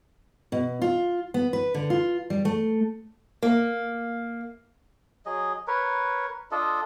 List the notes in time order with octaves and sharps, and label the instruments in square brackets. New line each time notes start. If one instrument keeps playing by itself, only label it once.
[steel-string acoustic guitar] B2
F4
B3
B4
D3
F4
G3
A3
A#3
[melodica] F#3 G#4 D#5
A#4 B4 C#5
D4 F4 A4 D#5